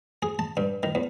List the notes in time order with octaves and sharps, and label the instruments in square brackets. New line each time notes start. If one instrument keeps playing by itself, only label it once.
[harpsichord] G#4
A5
G2
D#3
E2